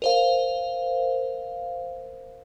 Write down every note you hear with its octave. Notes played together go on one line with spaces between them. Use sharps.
A#4 C5 F5